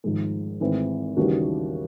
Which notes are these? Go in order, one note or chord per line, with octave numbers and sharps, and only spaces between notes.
G#1 G#2 F3 G#3
G#1 G#2 E3 A3 C4
D#2 C#3 E3 G3 F#4